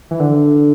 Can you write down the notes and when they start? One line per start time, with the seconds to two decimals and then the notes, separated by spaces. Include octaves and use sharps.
0.11 E3
0.20 D3